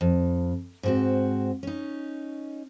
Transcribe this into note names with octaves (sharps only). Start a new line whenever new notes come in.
F2
G#2 C4 F#4
C#4 D#4